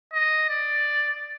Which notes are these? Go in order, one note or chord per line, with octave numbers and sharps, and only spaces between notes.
D#5
D5